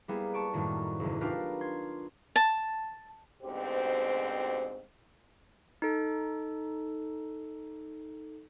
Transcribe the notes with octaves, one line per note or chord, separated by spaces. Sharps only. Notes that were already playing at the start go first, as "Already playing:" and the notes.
G3 A#3 B3 E4 G#4
A5 C#6 D7
F#2 A2 D#3 G3 B3
F#1 E2
D4 D#4 F4 G4 A#4 B4
C6 G#6
A5
D2 G#2 B2 C4 G4 C5
D#4 A4